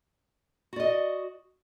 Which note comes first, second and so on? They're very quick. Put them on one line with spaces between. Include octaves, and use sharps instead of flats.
F#4 D5 D#5